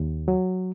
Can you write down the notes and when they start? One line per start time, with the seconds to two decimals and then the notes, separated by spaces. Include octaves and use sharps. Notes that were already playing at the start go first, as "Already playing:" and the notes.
Already playing: D#2
0.28 F#3